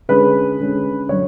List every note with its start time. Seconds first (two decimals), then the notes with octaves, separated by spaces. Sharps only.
0.09 D3 G#3 C#4 B4
0.60 D3 G#3 C#4
1.09 D3 F#3 C#5